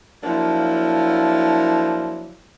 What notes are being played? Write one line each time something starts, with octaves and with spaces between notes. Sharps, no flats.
F3 F#3 A#3 D4 E4